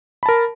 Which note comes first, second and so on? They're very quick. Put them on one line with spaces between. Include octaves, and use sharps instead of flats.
B5 A5 A#4